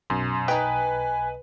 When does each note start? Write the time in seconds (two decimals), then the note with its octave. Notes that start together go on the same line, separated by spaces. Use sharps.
0.10 B1 F#2 C6
0.48 D#4 B4 G5 G#5